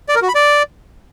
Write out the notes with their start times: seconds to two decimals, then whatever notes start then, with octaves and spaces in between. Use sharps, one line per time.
0.09 D5
0.15 A#4
0.22 F#4
0.28 B5
0.35 D5